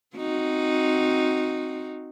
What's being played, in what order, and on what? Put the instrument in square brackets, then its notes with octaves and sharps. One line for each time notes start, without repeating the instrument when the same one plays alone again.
[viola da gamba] C4 D#4 F#4